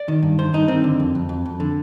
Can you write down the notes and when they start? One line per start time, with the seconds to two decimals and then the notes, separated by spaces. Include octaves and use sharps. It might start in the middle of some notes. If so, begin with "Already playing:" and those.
Already playing: D5
0.08 D#3
0.23 G2
0.39 D#3 C5
0.53 G2 D#4
0.68 D#3 C4
0.84 D3
1.00 F2
1.15 F2
1.29 F2
1.45 F2
1.60 D3